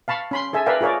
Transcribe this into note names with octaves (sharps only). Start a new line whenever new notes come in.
F5 A5 B5 C#6
C#4 B5 C6
G#4 A4 E5 G#5
A#4 B4 D5 E5 F5 G5
F4 G#4 A#4 C#5 D5